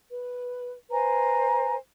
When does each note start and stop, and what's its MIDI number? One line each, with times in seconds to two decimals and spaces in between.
0.10 0.74 71
0.91 1.75 71
0.91 1.75 72
0.91 1.75 80
0.91 1.75 82